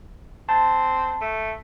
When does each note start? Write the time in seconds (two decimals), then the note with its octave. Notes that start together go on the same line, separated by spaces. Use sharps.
0.49 C4 A5
1.21 A3